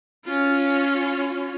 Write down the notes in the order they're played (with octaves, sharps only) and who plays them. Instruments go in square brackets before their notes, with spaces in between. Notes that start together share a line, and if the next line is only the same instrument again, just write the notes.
[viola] C#4 F4